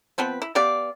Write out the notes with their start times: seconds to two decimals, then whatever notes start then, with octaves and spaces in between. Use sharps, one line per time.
0.18 F3 B3 C4 B4
0.42 E4
0.55 B3 G4 D5 F5